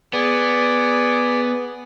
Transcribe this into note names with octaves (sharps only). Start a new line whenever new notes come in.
B3 G#4 D5